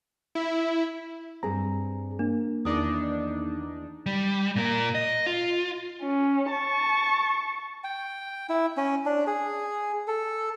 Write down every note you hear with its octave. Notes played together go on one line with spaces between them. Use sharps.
E4
G2 C4 G#4 A#5
A#3 D4
E2 D#3 D4 D#4 D6 D#6
G3
A#2 A#4
D#5
F4
C#4
A5 C#6
G5
E4
C#4
D4
G#4
A4